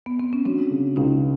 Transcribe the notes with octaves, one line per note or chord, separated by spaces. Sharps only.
B3
C4
C#4
F#3 C4 D4
C#3
C#2 C#4 D#4